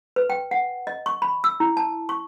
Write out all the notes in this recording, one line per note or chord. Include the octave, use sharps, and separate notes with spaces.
B4
G5
F#5
D#5
C#6
B5
E6
E4
A5
C#6